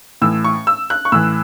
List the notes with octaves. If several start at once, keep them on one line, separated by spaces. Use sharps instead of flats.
A2 E3 E6
C#6
E6
F#6
C#6
A2 E3 E6